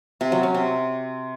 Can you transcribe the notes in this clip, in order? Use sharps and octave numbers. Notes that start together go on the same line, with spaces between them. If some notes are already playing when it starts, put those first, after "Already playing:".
C3
F#3
C#4
C3